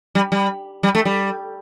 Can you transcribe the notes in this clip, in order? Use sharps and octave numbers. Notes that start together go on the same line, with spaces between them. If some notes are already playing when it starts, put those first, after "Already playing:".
G3
G3
G3
A3
G3